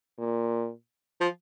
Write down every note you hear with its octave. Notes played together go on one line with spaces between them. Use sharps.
A#2
F3